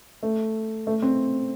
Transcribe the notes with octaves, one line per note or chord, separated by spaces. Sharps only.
A3
A3
C4